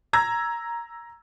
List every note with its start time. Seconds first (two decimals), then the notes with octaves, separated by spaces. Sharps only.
0.13 A#5 E6 G#6 A#6